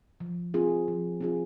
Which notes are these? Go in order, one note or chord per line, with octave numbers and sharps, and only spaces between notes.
F3
C4 F4 G#4
F3
C4 F4 G#4